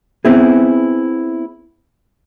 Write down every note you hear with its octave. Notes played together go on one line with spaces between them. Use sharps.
B3 C4 E4 G#4